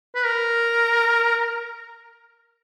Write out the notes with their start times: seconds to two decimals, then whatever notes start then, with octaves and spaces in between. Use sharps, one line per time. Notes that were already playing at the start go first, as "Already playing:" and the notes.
0.15 B4
0.25 A#4